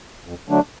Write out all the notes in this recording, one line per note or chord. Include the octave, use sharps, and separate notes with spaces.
F2
D3 F#3 A3 D4